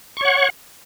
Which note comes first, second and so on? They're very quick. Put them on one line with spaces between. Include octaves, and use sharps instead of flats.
C#6 C#5 F#5